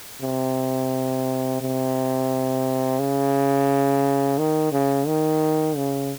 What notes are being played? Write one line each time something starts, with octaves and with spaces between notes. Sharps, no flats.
C3
C3
C#3
D#3
C#3
D#3
C#3